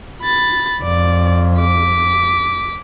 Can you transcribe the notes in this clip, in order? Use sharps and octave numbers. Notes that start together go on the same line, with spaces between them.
B5 A6
F2 D5
D6 B6